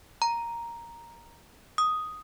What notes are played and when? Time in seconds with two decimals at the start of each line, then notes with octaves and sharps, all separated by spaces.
0.22 A#5
1.78 D#6